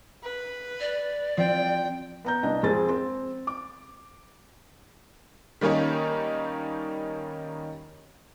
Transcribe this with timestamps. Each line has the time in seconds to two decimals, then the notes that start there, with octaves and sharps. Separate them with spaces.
0.23 B4
0.80 D5
1.37 F3 C4 F4 G5
2.25 B3 A#5 G6
2.43 C2 D4 D#5 A#5
2.63 F2 G#3 C4 G#4 A6
2.89 C4
3.47 D6
5.61 D#3 G3 A#3 C#4 D#4